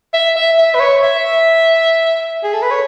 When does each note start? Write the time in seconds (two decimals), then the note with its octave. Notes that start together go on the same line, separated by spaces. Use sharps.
0.14 E5
0.36 E5
0.58 E5
0.74 B4
0.80 C#5
1.03 E5
2.43 G#4
2.53 A4
2.62 B4
2.71 C#5